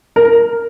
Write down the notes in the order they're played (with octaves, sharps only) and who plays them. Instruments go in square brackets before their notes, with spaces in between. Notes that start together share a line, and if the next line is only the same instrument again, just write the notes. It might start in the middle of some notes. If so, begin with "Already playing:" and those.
[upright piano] A#4